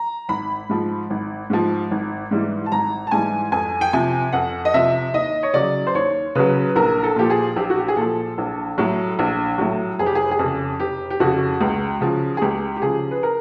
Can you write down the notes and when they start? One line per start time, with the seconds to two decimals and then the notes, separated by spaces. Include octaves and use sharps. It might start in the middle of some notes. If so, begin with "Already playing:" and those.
Already playing: A#5
0.29 G#1 B5
0.69 G#2 F3
1.10 G#1
1.50 G#2 F3
1.91 G#1
2.31 G#2 E3 G3
2.66 A5
2.72 G#1 A#5
3.07 A5
3.11 G#2 E3 G3 G#5
3.52 F2 G#5
3.81 G5
3.93 C3 F3 G#5
4.32 F2 F#5
4.65 D#5
4.74 C3 F3 E5
5.13 D#2 D#5
5.43 C#5
5.54 C#3 F#3 D5
5.87 C5
5.94 D#2 C#5
6.35 C#3 F#3 B4
6.76 A#1 A#4
7.03 A4
7.16 A#2 F3 G4
7.30 G#4
7.56 A#1 G4
7.70 F#4
7.79 G4
7.88 G#4
7.96 A#2 F3 A4
8.38 A#1
8.78 A2 F#3
9.19 A#1
9.58 A2 F#3
9.99 F1 G#4
10.06 G4
10.15 G#4
10.31 G#4
10.39 F2 G4
10.45 C#3
10.79 F1 G4
11.10 G4
11.20 F2 C#3 F#4
11.61 C#2
12.01 C#3 F3
12.37 G#4
12.42 C#2 G4
12.76 G4
12.82 C#3 F3 G#4
13.11 B4
13.23 A#4